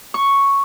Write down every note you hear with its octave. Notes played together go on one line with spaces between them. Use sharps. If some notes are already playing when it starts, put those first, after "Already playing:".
C#6